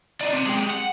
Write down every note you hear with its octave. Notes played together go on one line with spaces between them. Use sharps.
D4 D#4
C3
G#3 G4
F#5